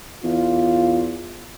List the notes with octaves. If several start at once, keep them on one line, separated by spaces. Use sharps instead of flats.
E2 F4